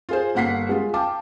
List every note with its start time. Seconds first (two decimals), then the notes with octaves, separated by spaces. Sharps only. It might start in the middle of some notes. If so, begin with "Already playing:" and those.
0.09 F4 G#4 C5
0.35 G1 A#3 F#5 B6 C7
0.69 G#3 F4
0.94 F5 G5 A5 D6